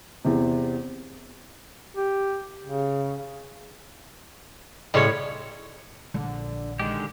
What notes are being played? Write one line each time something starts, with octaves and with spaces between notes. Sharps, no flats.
E2 C3
G4
C#3
A2 C#3 G3 G#3 C#5
A#1 D3
D3 D#3 G#3 G4